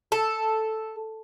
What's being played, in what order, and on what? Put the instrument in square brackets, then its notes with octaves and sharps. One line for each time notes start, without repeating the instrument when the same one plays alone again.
[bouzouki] A4